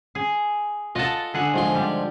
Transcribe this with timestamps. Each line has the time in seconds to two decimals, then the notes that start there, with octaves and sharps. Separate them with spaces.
0.15 G#4
0.95 F4 A4 D#5 F#5 A5
1.34 D3 G#4 F#5
1.54 G#2 F3 C6
1.75 G3